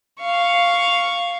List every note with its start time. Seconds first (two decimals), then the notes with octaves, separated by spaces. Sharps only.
0.20 F5 C#6